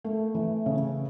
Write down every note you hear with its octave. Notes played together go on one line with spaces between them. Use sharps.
A3
E3
C#3